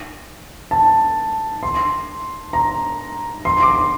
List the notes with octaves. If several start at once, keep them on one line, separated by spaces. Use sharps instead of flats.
A5
C6
A#5
C6
D6
C6